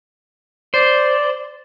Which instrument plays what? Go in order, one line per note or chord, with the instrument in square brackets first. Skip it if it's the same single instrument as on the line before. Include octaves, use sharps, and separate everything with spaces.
[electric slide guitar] C5 [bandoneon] D5